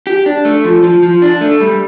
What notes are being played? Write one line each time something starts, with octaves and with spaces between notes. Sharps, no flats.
G4
D4
A3
F3
F3
F3
D4
A3
G3